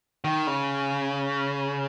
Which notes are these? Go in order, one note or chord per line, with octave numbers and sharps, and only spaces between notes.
D#3
C#3